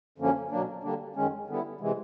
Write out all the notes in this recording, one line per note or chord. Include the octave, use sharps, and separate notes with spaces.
F#2 D3 F3 A#3 C#4
B2 F#3 A#3 D4
D3 G3 A#3 D4
F#2 D#3 G#3 C#4
D3 G3 B3 E4
C3 E3 G#3